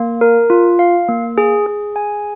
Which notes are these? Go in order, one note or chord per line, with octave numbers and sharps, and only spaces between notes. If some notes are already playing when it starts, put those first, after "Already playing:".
Already playing: A#3
A#4
F4
F5
A#3
G#4
G#4
G#5